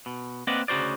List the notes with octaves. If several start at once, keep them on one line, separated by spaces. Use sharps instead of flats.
B2
A#3 C4 B4 D5 D#5 F#5
D2 C#3 F#4 C5 D5